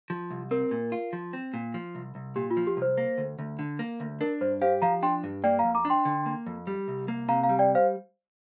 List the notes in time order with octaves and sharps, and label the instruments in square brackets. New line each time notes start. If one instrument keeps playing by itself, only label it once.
[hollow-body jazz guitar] F3
C2
[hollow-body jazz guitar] C4 [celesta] A#4
[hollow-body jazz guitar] A#2
F4
F3
C4
A#2
F3
C2
C2
[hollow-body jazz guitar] A#2 [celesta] G4
[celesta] F4
[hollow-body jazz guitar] F3
[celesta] G4
[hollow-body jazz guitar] C2 [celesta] C5
[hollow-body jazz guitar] A#3
D2
D2
D3
A#3
D2
[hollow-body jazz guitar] D4 [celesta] A#4
[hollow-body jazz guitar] G2 [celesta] C5
[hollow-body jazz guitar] G4 [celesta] C5 F5
[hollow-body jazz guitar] F3 [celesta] F5 A#5
[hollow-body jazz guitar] D4 [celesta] G5 C6
[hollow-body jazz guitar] G2
[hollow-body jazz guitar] A#3 [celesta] D5 G5
[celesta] F5 A#5
[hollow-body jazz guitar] F2
[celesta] A#5 D6
[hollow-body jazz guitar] D4
[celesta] G5 C6
[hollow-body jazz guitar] D3
A#3
F2
G3
C2
A#3
[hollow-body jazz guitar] C3 [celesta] F5 A#5
[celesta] F5 A#5
[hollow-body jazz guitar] G3
[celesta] D5 G5
C5 F5